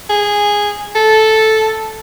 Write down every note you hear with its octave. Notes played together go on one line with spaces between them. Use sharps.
G#4
A4